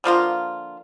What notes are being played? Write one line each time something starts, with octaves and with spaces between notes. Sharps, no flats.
D3 F3 A#3 F4